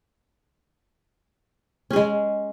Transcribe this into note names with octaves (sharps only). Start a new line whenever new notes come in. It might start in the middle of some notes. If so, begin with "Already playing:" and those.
G#3 C#4 G#4